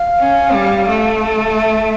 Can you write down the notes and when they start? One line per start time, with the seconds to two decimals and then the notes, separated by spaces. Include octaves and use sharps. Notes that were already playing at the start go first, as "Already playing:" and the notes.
Already playing: F5
0.19 C#4
0.53 G3
0.88 A3
1.57 E5